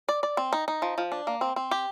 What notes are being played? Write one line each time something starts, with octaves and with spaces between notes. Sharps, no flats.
D5
D5
C4
D#4
D#4
F3
F3
D4
A#3
C4
C4
G4